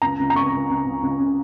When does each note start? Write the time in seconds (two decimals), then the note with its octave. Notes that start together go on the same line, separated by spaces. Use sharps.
0.02 C#2 A#5
0.19 C#2
0.30 A#5
0.36 C#2 C#6
0.53 C#2
0.70 C#2
0.86 C#2
1.03 C#2
1.20 C#3